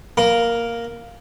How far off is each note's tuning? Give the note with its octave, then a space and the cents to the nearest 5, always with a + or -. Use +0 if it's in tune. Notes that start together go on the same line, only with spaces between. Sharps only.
A#3 +0 A#4 +0